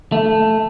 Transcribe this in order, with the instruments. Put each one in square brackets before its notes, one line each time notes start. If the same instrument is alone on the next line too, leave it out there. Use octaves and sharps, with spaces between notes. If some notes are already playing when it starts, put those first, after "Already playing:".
[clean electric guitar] A3